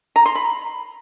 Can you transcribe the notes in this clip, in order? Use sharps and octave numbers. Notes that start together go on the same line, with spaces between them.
A#5
C6
B5